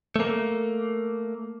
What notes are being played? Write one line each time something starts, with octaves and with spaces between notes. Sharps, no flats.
A3 A#3